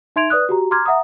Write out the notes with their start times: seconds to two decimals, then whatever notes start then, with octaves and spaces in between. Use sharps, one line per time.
0.16 D#4 E5 C6 G#6 D7 F7
0.30 B4 D5 D#6 F#6
0.49 F#4 G4 A#5
0.71 A#5 C6 D6 F6 G#6
0.86 E5 F#5 A#5 D#6